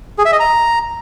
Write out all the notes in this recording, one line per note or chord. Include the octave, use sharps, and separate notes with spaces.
G#4
E5
D#5
A#5